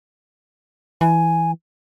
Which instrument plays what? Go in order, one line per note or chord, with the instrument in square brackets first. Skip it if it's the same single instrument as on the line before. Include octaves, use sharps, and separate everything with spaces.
[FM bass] E3 [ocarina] G#5